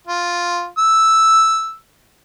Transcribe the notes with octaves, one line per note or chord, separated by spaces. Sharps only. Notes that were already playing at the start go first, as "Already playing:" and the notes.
F4
E6